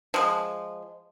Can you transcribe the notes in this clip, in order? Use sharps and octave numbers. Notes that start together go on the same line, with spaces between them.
F3 G#3